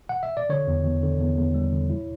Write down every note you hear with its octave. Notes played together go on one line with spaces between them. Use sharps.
F#5
E5
D5
D3 C#5
E2
E2
D3
E2
E2
G3
D3
E4